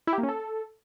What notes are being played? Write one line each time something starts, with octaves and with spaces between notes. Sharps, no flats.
E4
G4
A#3
C#4
A4